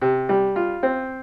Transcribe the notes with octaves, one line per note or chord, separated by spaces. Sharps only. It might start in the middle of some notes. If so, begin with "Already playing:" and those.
C3
G3
F4
C4